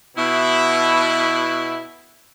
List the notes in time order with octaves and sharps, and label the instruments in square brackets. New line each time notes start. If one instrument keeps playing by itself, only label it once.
[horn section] B2 E4